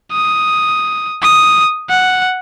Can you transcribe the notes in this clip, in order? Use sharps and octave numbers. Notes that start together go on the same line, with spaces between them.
D#6
D#6
F#5